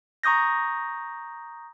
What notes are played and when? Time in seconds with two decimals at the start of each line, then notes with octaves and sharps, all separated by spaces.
0.23 A#5 C#6 D#6 G6 A#6